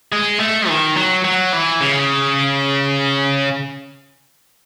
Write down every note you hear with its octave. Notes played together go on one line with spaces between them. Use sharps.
G#3
A3
D#3
F#3
F#3
E3
C#3